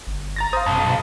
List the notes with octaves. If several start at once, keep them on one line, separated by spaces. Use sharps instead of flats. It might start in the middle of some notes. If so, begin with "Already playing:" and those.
G1
A#5 A6 A#6
C5 F5 D#6
B1 F#2 A5
B2